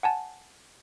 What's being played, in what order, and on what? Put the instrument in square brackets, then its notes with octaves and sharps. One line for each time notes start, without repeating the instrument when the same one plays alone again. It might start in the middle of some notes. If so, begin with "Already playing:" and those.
[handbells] F#5 G#5 A5